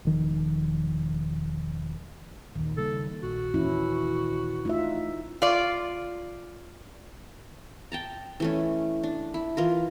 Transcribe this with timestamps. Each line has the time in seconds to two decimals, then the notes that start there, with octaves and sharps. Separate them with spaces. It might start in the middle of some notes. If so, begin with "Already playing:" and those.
0.05 E1 D#3 F3
2.56 A#1 D#2 D#3
2.77 C#3 G3 A#3 A4
3.23 A#1 F#4
3.54 D#2 A#2 E3 C#4 E4
4.65 A3 D#4 F4 E5
5.42 F4 D5
7.92 G5 A5 A#5
8.40 E3 A3 C#4
9.03 D4
9.34 E4
9.57 E3 F4 A#4